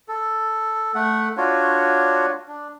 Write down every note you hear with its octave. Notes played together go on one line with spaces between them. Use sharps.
A4
A3 F#5
D4 F4 F#4 C#5
D4